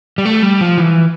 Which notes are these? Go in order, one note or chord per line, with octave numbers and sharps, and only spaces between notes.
G3
A3
G3
F3
E3